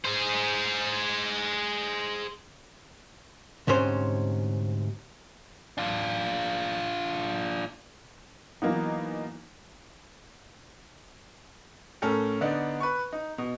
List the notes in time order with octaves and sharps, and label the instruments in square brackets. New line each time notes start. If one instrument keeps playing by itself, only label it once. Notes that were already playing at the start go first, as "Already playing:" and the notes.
[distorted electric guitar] G#4 C5
[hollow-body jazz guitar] D2 G#2 C3 C#4 C5
[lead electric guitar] D4 F4
[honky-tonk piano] E3 F#3 A#3 B3 D#4
[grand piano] A2 C#4 A4 A#4
D3 B3 D4 D#4
B4 C#6
D#4
B2